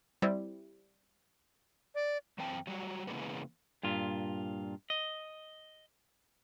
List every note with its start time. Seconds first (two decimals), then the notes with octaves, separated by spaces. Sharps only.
0.22 G3 C4 E4
1.95 D5
2.38 F#2 E3 C4 G5 A5
2.67 F#3 G3 F#4
3.07 C#3 E3 G#3 A#3 B3
3.83 G2 A#2 F4
4.90 D#5